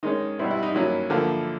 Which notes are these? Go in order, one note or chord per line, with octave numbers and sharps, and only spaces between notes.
D#3 G#3 C#4 D#4
B2 G3 C4 E4
E4
D#4
D#3 F#3 A#3 C#4 E4
D3 F3 A#3